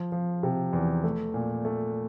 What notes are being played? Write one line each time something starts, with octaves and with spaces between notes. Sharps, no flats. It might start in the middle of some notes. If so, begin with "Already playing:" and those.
Already playing: F3
F3
C3
E2
A3
A#2
A3